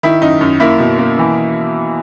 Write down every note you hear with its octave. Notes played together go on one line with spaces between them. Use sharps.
D#3 E4
F#2 D#4
F#2
A#3 E4
B2
A#3
E3